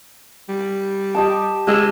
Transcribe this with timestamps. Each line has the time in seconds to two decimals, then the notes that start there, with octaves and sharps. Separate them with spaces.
0.49 G3
1.14 G4 D#5 A5
1.67 G#3 G4 E6